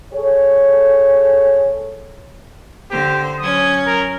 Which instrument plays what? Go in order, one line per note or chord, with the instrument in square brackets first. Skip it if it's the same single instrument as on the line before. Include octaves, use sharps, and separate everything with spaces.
[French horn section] G#4 A4 C#5
[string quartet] D3 C5 [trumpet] G4
[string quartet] F#3 C#4 G#6 [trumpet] D#6
[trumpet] A#4